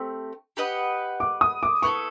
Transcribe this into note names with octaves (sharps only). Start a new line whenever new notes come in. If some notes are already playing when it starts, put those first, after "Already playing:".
Already playing: A3 C4 G4
G4 B4 D#5 F#5
D6
D#6
D6
B3 E4 A4 C#6